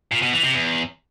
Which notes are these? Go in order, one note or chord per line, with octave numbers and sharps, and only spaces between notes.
A#2
B2
E3
C3
E2